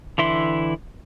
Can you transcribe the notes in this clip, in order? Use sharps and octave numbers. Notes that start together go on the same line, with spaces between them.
D3 E3 E4 C6